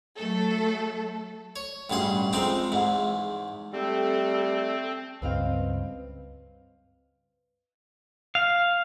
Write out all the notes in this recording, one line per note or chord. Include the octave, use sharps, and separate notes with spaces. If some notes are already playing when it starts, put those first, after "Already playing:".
F#3 A3 A4
C#5
A1 G2 B2 G#4 C6
F2 G#3 C4 D#4
E2 G#2
G3 A3 C4 A4
C#2 G2 C4 B4 D#5 F5
F5